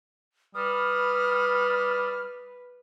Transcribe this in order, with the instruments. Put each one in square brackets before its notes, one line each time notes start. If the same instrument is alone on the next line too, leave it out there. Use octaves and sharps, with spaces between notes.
[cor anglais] G3 [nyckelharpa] B4 [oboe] D#6 [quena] F6